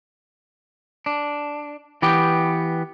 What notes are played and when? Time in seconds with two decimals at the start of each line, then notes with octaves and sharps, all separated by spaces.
1.06 D4
2.02 E3 B3 G4 G5